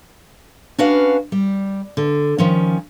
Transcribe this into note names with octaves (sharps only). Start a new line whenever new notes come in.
C#4 D4 F#4 B4 F5
G3
D3
D#3 F3 C#4